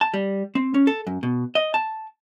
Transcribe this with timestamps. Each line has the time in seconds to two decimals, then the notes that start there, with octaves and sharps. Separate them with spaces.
0.01 A5
0.14 G3
0.55 C4
0.74 C#4
0.87 A4
1.07 F#2
1.23 B2
1.55 D#5
1.74 A5